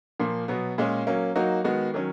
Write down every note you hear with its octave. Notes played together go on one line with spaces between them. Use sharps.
A#2 F3 A#3
B2 F#3 B3
A#2 G#3 C#4
F#3 A#3 C#4
F#3 A#3 D#4 F#4
D#3 G#3 B3 F#4
D#3 F#3 C#4